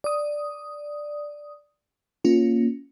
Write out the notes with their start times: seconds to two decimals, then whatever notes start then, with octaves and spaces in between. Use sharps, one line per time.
0.04 D5 D#6
2.24 A#3 C#4 F4